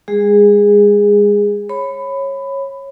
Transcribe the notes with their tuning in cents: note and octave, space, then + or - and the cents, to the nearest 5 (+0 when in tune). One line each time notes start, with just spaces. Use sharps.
G#3 -35 G#4 -15
C#5 -20 B5 +15